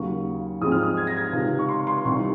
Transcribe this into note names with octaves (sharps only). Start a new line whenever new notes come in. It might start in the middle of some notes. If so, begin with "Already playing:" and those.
Already playing: D#2 C#3 F#3 A#3 C#6
G#2 F3 G#3 C4 D#6
F6
D#6
G#6
A#6
G#6
C#2 C3 D#3
C#6
C6
C6
C2 C3 D#3 C#6